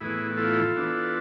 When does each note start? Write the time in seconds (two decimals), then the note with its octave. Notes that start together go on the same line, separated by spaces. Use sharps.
0.01 A2 E3 B3 E4 G#4
0.37 F4 A4
0.75 E3 B3 D4